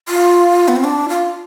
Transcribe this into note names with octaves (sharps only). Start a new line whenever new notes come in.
F4
B3
C4
D4
F4